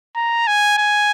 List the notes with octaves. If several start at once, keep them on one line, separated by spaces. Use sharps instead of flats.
A#5
G#5
G#5